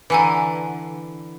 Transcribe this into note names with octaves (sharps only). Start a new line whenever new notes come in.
D3 E3 B4 G#5 A#5